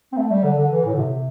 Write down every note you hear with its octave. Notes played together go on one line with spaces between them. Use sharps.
C4
A3
G3
D3
D3
E3
A2
D3
C3